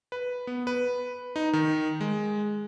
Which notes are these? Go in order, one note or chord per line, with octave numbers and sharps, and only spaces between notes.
B4
B3
B4
D#4
D#3
G#3